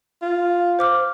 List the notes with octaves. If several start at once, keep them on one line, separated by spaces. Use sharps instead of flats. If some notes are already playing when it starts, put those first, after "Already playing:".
F4
C5 D6 F6